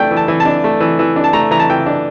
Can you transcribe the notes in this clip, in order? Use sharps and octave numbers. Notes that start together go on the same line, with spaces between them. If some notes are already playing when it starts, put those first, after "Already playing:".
Already playing: E3 A3 D4 G5
E3
A5
E3
A5
D4
A3
E3
E3
D4
A5
A3 A#5
E3 A#5
A5
E3 G5
D4